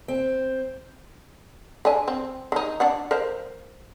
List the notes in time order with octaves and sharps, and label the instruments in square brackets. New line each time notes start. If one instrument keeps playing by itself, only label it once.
[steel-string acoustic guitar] C4
[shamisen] D3 D4 G#5
C4
D#3 D#4
D4 D5 F#5
A#4 C5 F5